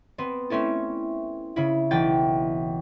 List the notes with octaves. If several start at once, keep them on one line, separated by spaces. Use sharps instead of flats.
B3 C4
A3 C4 C#4 E4 A4
C#3 E4
B1 E3 G5 A6